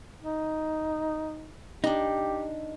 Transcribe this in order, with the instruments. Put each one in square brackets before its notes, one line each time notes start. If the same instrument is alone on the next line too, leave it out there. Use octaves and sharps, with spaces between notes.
[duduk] D#4
[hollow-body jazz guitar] D4 D#4 [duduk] G4